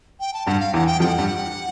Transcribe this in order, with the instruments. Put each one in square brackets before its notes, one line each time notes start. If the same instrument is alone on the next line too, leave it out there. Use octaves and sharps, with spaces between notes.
[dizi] G5
A5
[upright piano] G2 G3 [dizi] F#5
[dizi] F5
[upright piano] E2 E3 [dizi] F#5
[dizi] G5
[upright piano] F2 F3 [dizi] G5
[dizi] F#5
[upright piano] G2 G3